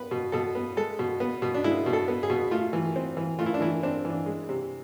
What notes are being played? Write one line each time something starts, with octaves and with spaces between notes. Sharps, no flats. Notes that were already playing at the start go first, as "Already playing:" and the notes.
Already playing: B3 B4
B2
B2 A4
B3
G#3 A4
B2
B3
B2
D4
G#3 E4
B2
A4
B3
G#4
B2
A3 F4
E3
C4
E3
A3 F4
E4
D4
E3 E4
C4 D4
E3
D4
G#3
C3